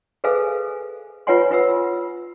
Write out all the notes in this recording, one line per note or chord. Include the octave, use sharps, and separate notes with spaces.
G#4 A4 B4 C5 F5 G#5
F4 B4 C#5 F#5 G#5 C6
F4 B4 F#5 E6